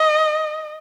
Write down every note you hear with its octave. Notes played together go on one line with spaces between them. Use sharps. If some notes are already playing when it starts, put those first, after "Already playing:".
Already playing: D#5